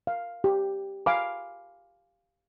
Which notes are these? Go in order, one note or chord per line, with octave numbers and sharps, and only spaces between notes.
F5
G4
F5 G#5 B5 D6